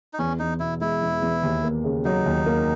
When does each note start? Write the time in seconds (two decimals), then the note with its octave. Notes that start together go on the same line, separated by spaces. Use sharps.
0.13 D#4
0.19 E2 C#4
0.39 E2 D#4
0.60 B2 E4
0.81 G#3 E4
1.02 E2
1.22 E2
1.43 D#2
1.63 A#3
1.84 C#3
2.05 F#3 D#4
2.26 D#2
2.46 A#3